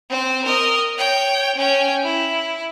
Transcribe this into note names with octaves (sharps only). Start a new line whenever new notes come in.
C4 C5
A#4 D#5
C#5 G5
C#4 G5
E4